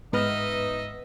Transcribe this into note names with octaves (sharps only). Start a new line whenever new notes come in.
G#2 B3 D#4 B4 D#5 E5 F6